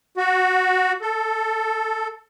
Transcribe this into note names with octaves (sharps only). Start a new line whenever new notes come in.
F#4
A4